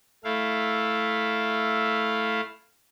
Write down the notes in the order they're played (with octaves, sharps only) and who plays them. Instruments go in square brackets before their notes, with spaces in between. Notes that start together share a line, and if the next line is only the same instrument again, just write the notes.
[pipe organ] A3 E4 F5